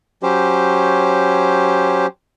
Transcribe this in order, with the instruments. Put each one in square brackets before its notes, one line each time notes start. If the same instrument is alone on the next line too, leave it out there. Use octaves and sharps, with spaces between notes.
[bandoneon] F#3 C#4 G4 C5